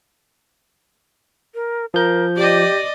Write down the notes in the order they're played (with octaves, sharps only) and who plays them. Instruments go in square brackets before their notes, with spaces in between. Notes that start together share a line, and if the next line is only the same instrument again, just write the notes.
[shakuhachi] A#4
[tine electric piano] F3 G6 [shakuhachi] A#4
[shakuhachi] G4 [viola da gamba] D5 D#5